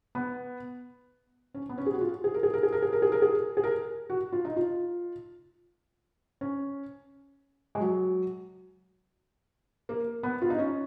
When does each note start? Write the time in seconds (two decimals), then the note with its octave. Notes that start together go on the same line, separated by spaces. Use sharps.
0.15 B3
1.54 C#4
1.69 B3
1.78 C#4
1.86 G#4
1.93 F#4
2.01 F4
2.24 G#4
2.34 A#4
2.43 G#4
2.54 A#4
2.63 G#4
2.72 A#4
2.82 G#4
2.93 A#4
3.02 G#4
3.12 A#4
3.22 G#4
3.57 G#4
3.64 A#4
4.10 F#4
4.33 F4
4.45 D#4
4.56 F4
6.41 C#4
7.75 G#3
7.80 F#3
9.89 A#3
10.23 B3
10.42 F4
10.50 D#4
10.59 C#4